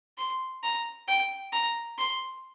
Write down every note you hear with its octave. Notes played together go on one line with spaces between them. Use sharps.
C6
A#5
G5
A#5
C6